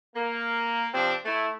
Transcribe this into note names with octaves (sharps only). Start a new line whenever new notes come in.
A#3
C3 F3 C4 D4
A3 E4